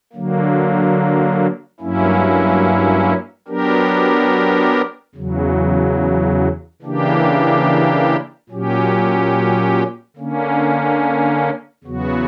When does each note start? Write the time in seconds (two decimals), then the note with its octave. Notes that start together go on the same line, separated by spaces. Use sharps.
0.13 D3 F#3 A#3
1.80 G2 F#3 A#3 C#4 E4
3.48 F#3 B3 D4 G4 A#4
5.15 E2 C#3 F#3
6.82 C#3 E3 A#3 D4 G4
8.49 A#2 F#3 C#4 G4
10.16 D3 A#3 C#4
11.84 E2 C#3 F#3 B3 F#4